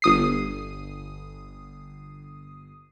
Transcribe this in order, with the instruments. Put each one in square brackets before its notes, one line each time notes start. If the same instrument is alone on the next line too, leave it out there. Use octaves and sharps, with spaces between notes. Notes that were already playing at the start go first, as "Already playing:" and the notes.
[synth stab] G1 D#6 C7